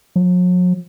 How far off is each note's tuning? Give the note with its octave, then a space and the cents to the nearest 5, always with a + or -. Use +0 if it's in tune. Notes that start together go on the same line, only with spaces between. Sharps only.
F#3 -45